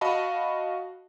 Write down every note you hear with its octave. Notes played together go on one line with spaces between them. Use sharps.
F#4 D#5 F5 A5 B5